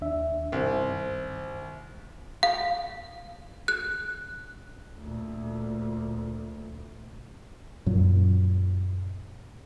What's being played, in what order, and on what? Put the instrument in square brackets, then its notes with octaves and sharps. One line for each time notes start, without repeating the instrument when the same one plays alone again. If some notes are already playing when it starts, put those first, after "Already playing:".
[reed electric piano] D#2 D4 E5
[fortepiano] C2 [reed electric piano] G2 D#3 C5
[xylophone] F5
F#6
[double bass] D2 A#2
[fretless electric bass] F#2 A#2 F#3